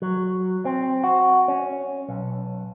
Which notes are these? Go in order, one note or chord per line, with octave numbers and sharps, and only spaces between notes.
F#3
C4
F#4
C#4
B1